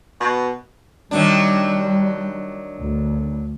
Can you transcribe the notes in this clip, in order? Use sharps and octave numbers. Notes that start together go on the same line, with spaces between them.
B2
D#3 F#3 G3 D4
D2